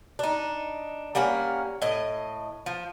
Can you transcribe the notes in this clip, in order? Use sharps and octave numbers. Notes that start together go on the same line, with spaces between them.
D4 D#4
G3 A#3 C#4 F#5
A2 D#5
F3